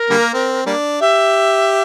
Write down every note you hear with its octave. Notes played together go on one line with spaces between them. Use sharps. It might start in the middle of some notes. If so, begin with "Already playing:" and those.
Already playing: A#4
D3 G3 A#3
C4
G3 A#3 D4
G4 E5